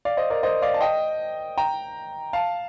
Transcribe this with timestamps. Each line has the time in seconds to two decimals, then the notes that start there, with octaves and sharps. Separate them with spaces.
0.05 D5 F5
0.17 C5 D#5
0.30 A#4 D5
0.43 C5 D#5
0.62 D5 F5
0.74 A5
0.81 D#5 G5
1.58 G5 A#5
2.33 F5 A5